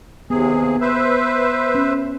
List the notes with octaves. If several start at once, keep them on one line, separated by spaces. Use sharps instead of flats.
D#2 C3 B3 G#4
B4 C5 E5
C#4